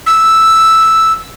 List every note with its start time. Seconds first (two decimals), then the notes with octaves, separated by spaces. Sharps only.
0.06 E6